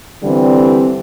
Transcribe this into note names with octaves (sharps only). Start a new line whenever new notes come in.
D3 E3 G3 C4